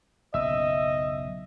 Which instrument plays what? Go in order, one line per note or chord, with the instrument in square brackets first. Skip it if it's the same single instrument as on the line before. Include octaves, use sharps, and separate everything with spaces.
[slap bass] F#1 B1 [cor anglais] D#5 [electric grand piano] E5 E6